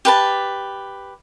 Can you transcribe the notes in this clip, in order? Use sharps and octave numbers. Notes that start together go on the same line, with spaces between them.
G4 B4 A5